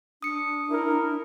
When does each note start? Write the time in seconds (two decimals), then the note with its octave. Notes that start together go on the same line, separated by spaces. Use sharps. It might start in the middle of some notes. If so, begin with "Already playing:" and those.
0.22 D4 D#6 C#7
0.70 E4 A#4